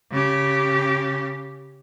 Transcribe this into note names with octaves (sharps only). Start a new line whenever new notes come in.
C#3 G4